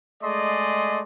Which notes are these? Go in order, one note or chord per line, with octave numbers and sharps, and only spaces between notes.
G#3 A3 G#4 D5 D#5 C6